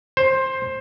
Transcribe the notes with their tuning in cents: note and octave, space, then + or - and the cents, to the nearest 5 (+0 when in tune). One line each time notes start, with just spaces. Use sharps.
C5 +15